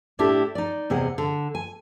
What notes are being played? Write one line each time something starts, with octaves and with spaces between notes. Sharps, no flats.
A2 D4 E4 G4 A4
D#4 D5
E2 C3 G#4 D#5 F#5
D3
G#5